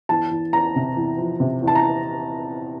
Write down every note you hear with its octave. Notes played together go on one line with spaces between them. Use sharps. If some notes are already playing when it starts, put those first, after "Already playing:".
E2 A5
E2
E2 A#5
C3
E2
F3
C3
E2
A5
A#5